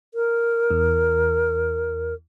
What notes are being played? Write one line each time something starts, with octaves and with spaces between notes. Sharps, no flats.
A#4
E2